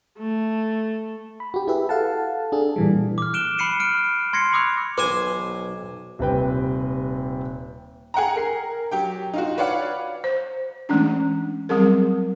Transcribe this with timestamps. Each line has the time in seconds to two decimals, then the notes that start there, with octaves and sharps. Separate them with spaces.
0.19 A3
1.40 B5
1.54 F#4 G4
1.67 E4 G4 G#4 B4 E5
1.89 A4 F5 F#5 A5
2.52 D4 G#4 A4
2.76 A#2 E3 G3
3.18 D6 F6
3.33 F#6 D7 E7 G7
3.58 B5 F#6 C7 C#7 D#7
3.80 F6 D7
4.33 C6 G#6 A#6 C7 C#7
4.52 B5 C#6 D6 E6 F#6 F7
4.98 B1 B4 C5 G#5 D6
6.19 D#1 C3 B4 G5
8.14 G#4 F#5 G5 A#5
8.36 A#4 C7
8.91 F#3 G4 G5
9.34 D#4 F4 F#4
9.58 B4 C#5 D5 F5 F#5
10.24 C5
10.89 E3 G#3 A3 C#4 D4
11.69 F#3 G3 C4 G#4 A#4